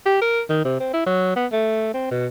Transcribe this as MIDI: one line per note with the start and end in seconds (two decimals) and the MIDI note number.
0.06 0.17 67
0.21 0.42 70
0.50 0.63 51
0.65 0.77 48
0.80 0.93 60
0.94 1.02 64
1.06 1.31 54
1.36 1.46 59
1.52 1.93 57
1.94 2.06 60
2.11 2.27 47